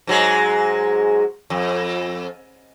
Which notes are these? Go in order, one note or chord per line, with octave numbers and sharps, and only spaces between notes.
G#2 F#3 G#3
F2